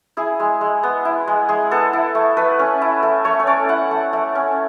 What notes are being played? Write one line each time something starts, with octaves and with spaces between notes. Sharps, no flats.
E4 G#4
G#3
G#3
B3
E4
G#3
G#3 G#4
B3 A4
E4
A3
A3 B4
C#4
E4
A3
A3 C#5
C#5
C#4 D5
E4 F#5
A3
A3
C#4